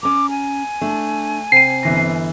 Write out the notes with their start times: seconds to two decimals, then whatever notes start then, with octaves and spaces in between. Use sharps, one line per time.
0.03 C#4 A#5 D6
0.30 G#5
0.81 A3 D4
1.52 C3 G5 C7 D#7
1.83 G1 E3 A#6